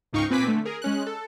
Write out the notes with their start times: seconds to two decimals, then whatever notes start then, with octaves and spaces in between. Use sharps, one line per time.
0.13 C#2 G#2 D#4 F5 G5 C#6
0.30 A#2 C4 B4 G#5 D6 B6
0.47 D3 A3
0.65 G#4 A#4
0.82 G#3 C#4 F#6
1.06 A4